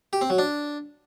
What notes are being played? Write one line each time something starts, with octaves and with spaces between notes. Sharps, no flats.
G4
C4
F#3
D4